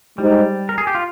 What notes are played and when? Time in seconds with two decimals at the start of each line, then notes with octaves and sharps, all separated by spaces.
0.18 G3 G#3 D#4 G4 C5
0.69 A#4
0.78 G#4
0.87 G4
0.95 F4